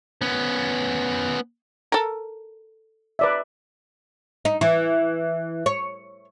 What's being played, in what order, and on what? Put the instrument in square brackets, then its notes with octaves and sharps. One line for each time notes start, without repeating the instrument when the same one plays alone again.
[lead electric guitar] B3 C#4
[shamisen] A4 A#4
[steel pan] B4 D5 E5
[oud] D#4
E3
C#5